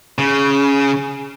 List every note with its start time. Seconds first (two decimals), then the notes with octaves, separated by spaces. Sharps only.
0.19 C#3